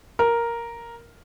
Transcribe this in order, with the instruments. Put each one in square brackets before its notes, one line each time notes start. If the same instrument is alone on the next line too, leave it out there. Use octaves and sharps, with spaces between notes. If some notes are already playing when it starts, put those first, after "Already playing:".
[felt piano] A#4